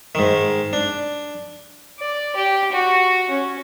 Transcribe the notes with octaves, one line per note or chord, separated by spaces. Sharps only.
G#2 D#3
D4
D5
G4
F#4
C#4